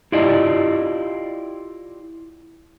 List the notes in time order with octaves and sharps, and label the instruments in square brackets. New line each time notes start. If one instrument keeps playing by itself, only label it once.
[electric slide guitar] E4 F4 G4 D5 D#5